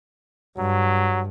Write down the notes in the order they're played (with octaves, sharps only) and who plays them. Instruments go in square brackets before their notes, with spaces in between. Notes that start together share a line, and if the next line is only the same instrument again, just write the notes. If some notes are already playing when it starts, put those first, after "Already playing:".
[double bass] G2 [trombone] F#3